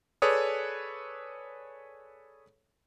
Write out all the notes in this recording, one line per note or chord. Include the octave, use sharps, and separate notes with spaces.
G#4 A4 B4 C#5 D5 D#6